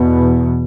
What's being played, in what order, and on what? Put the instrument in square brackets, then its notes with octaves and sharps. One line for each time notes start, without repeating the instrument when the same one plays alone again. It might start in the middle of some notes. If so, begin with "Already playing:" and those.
Already playing: [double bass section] E2 B2